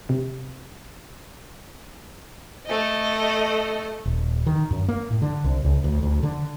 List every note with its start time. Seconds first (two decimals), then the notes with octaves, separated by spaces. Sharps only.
0.09 C3
2.66 A3 D#5
4.05 D#1
4.46 D#3
4.71 F#2
4.88 A#3
5.10 A2
5.22 D3
5.44 C2
5.64 C#2
5.84 D2
6.03 D2
6.23 D3